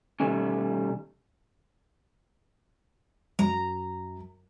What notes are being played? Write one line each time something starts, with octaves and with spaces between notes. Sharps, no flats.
B2 D#3 G3 A3 C#4
F#2 A#5